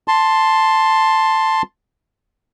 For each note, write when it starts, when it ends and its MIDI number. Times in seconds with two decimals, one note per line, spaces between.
0.08 1.62 81
0.08 1.62 84